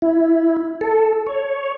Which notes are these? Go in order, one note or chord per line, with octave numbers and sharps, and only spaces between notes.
E4
A4
C#5